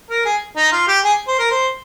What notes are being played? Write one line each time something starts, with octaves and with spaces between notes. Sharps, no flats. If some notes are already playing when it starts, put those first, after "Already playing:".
A#4
G#4
D#4
F4
G4
G#4
C5
A#4
C5